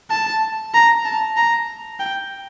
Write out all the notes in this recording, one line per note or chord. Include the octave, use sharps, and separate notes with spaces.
A5
A#5
A5
A#5
G5